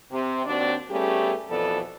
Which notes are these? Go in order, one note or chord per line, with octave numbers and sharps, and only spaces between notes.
C3
D#2 C4 D4 F#4 D5
G3 A3 B3 C#4 G4 G#4
F2 B2 E3 B3 A4 D5